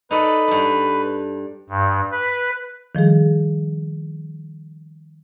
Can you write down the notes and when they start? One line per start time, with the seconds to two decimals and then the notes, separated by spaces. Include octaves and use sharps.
0.11 D#4 A4 B4 D5
0.48 G2 D4
1.70 G2
2.12 B4
2.95 D#3 F3 G3 G#4